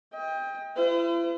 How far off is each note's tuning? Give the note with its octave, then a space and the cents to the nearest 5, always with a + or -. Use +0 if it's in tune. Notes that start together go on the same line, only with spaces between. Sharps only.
D#5 +35 G5 +20
E4 +45 C5 -45